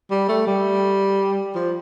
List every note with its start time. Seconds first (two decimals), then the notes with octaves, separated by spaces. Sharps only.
0.11 G3
0.29 A3
0.47 G3
1.55 F3